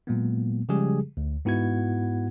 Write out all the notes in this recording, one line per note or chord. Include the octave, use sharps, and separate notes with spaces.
A#2 F#3 G#3 A#3 B3
C#3 F3 G3 G#3 G4 G#4
D2
G#2 B3 E4 F#4 F#5 G#6